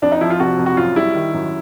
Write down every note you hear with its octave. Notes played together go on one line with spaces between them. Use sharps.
F2 D4
D#4
F3 E4
F4
C3 F#4
F2
F#4
F#2 F4
G3 E4
D#3
F#2